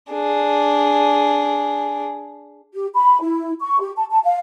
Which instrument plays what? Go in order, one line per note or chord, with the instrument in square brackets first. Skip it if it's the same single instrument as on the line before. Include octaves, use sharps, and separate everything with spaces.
[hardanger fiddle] D4 G#4
[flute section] G4
B5
E4
C#6
G4
A5
A5
F5